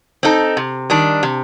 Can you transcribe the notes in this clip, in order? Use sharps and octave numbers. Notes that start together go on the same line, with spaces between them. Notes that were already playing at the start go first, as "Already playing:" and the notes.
C4 D#4 A4
C3
D#3 G3 D4
C3